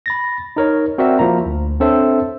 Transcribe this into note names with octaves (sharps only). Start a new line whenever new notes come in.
B5 A6 A#6
D#4 A#4 C#5
C4 F#4 A#4 D5 E5
F3 A#3 E4 A#5
D2
C4 D4 A4 C5 C#5 E5